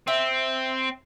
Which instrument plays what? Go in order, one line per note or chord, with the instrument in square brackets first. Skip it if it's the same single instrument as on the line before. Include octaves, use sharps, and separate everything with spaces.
[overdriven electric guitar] C4 [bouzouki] E5